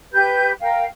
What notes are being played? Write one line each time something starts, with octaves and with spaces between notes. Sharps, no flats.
G4 B4 G6
A#4 F5 G5